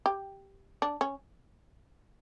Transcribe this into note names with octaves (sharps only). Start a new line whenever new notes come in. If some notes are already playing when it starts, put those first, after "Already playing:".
G4
D4
C#4